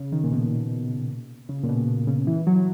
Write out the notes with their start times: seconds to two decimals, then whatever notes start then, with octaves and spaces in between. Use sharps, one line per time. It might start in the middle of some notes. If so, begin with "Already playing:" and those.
Already playing: C#3
0.12 D#3
0.24 A#2
0.32 B2
1.49 C#3
1.63 A#2
1.69 B2
1.87 B2
2.07 C#3
2.27 E3
2.47 F#3